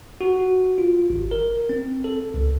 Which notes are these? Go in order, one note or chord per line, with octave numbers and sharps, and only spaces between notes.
F#4
F4
G#1
A#4
C4
A4
C#2